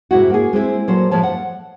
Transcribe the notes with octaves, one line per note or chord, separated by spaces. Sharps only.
G#2 C3 E4 F#4
A#3 G#4
G#3 C4 E4 G#4
A#2 F#3 A4 C5
A2 F3 G#3 C#5 A5
F#5